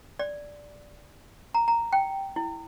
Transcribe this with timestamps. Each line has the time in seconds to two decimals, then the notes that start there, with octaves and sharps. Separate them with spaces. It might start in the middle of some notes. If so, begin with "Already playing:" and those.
0.19 D5
1.55 A#5
1.68 A#5
1.93 G5
2.36 E4